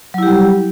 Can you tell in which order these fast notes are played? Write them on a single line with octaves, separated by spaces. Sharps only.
F#3 E4 G4 G3